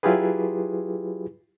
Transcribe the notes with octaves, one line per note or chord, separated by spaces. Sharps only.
F#3 E4 F4 G4 G#4 B4